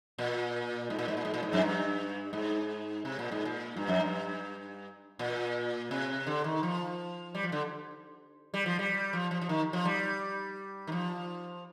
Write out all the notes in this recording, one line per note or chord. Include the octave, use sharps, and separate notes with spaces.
A#2
G#2
A#2
G#2
A#2
G#2
A#2
G#2
F2
G2
G#2
C3
A#2
G#2
A#2
G2
F2
G2
A#2
C3
D3
D#3
F3
G3
F3
D3
G3
F3
G3
F3
F3
F3
D#3
F3
G3
D#3
F3